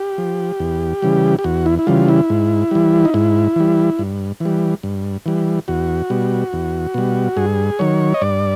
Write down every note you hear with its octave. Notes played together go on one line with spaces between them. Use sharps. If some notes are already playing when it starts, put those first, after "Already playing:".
Already playing: G4
F3
E2
C#3 E3 G3
G4
E2 F#4
E4
E4
C#3 E3 G3 F4
E4
G#2
E3 G3
D#4
G#2 E4
E3 G3
G2
E3
G3
G2
E3 G3
E2 F#4
B2 G3
E2
B2 G3
G2 G#4
D#3 F#3 C#5
D#5
G2 D5